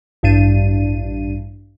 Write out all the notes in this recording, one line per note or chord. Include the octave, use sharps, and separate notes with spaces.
A1 G2 D4 D#7